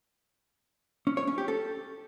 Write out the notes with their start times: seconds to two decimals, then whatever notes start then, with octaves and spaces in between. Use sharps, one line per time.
1.07 C#4
1.17 C#5
1.27 C#4
1.38 G4
1.48 A4